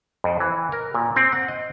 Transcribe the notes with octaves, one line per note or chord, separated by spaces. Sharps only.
F2
E3
A#4
A#2
C4
F#5
D#5